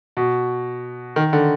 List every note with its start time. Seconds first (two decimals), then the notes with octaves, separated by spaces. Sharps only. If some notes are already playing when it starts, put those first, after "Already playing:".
0.17 B2
1.16 D#3
1.33 D3